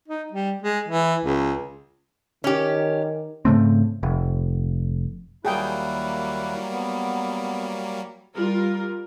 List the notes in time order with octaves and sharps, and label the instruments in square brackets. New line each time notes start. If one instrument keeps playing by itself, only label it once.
[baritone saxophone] D#4
G3
G#3
E3
C#2
[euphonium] D#3 [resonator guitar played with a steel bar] C#4 G4
[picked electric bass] G#2 C#3 A3 C4
F1
[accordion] D#2 E4 F#6 [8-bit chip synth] F#3 G3 A#3 [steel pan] G#4 G5
[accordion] B3
[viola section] G3 F4 A#4